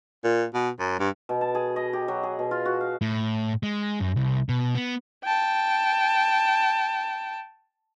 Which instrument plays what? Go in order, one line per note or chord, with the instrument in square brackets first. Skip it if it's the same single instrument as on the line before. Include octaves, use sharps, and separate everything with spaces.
[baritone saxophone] A#2
B2
F#2
G2
[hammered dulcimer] B2
A5
G#4
D#5
G4
F#3
G#4
B2
F4
F#4
F5
[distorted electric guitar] A2
G#3
F#2
C2
B2
B3
[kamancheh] G5 A5